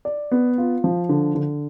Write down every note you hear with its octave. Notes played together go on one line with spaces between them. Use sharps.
D5
B3
F4
F3
D3
D3